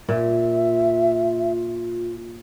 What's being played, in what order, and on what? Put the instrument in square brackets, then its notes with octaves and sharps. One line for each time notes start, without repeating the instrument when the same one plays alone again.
[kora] A#2 [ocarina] F4 [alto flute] E5